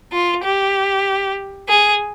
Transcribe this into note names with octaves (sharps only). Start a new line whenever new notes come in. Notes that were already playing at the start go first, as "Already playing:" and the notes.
F4
G4
G#4